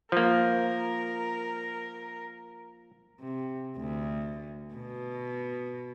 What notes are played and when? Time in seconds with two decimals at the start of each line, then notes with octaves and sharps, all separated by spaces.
0.12 F3 A#3 A#4
3.20 C3
3.77 D2
4.74 B2